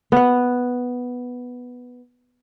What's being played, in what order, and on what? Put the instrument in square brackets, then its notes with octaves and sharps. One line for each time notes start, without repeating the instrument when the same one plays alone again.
[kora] B3 F#5